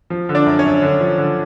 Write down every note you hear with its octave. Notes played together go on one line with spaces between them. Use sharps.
F3
D3
D4 D5
F#2
C#4 C#5
F#2
D3
F3
D3